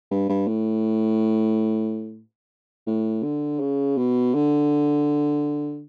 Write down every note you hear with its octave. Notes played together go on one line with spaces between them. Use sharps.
G2
G2
A2
A2
D3
C#3
B2
D3